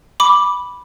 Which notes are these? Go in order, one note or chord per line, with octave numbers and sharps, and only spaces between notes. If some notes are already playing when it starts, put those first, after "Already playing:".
B5 D6